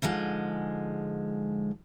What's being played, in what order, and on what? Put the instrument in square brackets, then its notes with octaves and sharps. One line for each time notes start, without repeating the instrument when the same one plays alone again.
[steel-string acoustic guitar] G#2 D3 F3 G#3